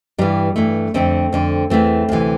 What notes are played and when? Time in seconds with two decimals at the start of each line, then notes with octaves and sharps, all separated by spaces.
0.18 G2 E3 G3
0.56 G2 E3 A3
0.94 F2 D3 A3 C4
1.33 F2 D3
1.70 E2 E3 A3 C4
2.09 D2 C3 E3